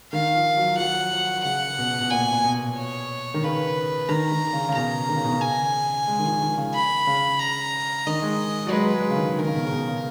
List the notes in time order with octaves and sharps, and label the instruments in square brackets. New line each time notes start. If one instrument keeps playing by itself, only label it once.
[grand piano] D#3 [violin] F5
[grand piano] F3
F#3
F3
[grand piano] F#3 [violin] F#5
[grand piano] F3
[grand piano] C#3 [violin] F#5
[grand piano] B2
B2
[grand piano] A#2 [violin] G#5
[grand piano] A#2
B2
[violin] C#5
[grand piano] D#3
[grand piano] C#3 [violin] B4
[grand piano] D#3 [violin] A#5
[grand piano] D#3
C#3
C#3
[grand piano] B2 [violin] A#5
[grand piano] D#3
C#3
B2
C#3
[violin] G#5
[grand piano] G#3
D#3
F3
D#3
C#3
[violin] B5
[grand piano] C#3
[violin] A#5
[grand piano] D#3 [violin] D#5
[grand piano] G#3
F#3
[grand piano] G#3 [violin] B4
[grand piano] G#3
C#3
D#3
[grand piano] D#3 [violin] A#4
[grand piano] C#3
B2
C#3
B2
C#3